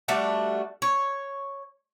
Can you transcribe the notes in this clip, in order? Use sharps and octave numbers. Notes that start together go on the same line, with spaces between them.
G3 A3 D4 F#4
C#5